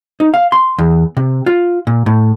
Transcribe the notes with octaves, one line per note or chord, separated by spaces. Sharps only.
D#4
F5
C6
E2
C3
F4
A#2
A2